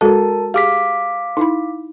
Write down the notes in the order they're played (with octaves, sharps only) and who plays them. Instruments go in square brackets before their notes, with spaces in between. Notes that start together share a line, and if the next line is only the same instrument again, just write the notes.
[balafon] G#3 F#4 A4 [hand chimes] A#4 A5
[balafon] G4 G#4 [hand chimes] F5 D6 B6
[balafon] D#4 E4 B5